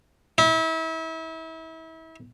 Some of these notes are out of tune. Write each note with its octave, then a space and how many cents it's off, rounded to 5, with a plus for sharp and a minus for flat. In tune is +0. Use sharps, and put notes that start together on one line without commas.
E4 -35